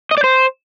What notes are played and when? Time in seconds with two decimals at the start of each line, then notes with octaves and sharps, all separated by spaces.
0.11 D#5
0.18 D5
0.24 C5